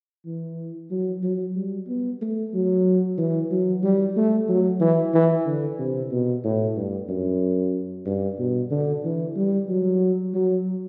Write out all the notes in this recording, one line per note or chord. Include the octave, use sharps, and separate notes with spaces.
E3
F#3
F#3
G3
B3
A3
F#3
E3
F#3
G3
A3
F#3
E3
E3
D3
C3
B2
A2
G2
F#2
G2
B2
D3
E3
G3
F#3
F#3